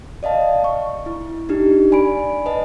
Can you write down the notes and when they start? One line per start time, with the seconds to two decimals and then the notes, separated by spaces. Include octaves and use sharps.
0.23 D5 D#5 F5 A5
0.64 C#6
1.06 E4
1.49 D4 D#4 G4
1.92 D5 G#5 B5 D7
2.46 B4 D#5 A5